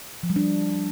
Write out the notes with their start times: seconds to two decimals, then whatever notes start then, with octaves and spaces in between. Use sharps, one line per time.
0.23 F3
0.30 G3
0.36 D4